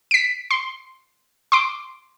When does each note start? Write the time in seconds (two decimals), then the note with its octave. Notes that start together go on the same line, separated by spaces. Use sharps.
0.11 B6 D7
0.51 C6
1.52 C6 D6